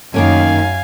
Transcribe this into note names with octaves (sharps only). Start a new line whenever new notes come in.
F#2 D#3 A#3 C#4 F5 G#5